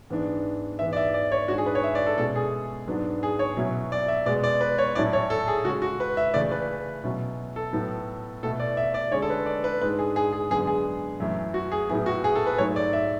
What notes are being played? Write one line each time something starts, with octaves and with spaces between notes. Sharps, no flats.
G#2 E3 B3 D4
G#2 E3 B3 E5
D5
E5
D5
C#5
G#2 G#3 D4 F#4
G#4
B4
C#5
E5
D5
A4
B2 G#3 C#4 E4 A4
G#4
G#2 F#3 B3 D4
G#4
C#5
B2 F#3 C#4 E4
D5
E5
B2 G#3 B3 D5
D5
B4
C#5
A2 F#3 C#4 E4 D5
C#5
A4
G#4
C#3 G#3 C#4 F#4
F#4
B4
E5
C#3 E3 A3 D5
B4
B2 F#3 C#4 E4
A4
A2 F#3 B3
B2 A3 E4 A4
D5
E5
D5
D3 G#3 C#4 C#5
A4
B4
D5
B4
G#2 G#3 D4 B4
G#4
G#4
G#4
F#2 D3 G#3 B3 G#4
G#4
F#2 E3 A3 E4
F#4
G#4
A2 F#3 B3 E4 G#4
F#4
G#4
A4
B4
G#2 F#3 A3 C#5
D5
E5